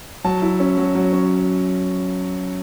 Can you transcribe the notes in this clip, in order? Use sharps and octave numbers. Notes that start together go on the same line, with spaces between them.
F#3 A5
E4
C#4
F#3
F#3
C#4